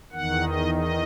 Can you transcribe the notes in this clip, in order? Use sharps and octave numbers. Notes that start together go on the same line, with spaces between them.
E2 D#3 F#5
D#5
D#5